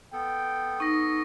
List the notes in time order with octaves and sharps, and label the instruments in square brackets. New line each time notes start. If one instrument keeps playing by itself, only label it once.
[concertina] B3 A4 [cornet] G5
[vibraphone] D#4 [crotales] C#6 A#6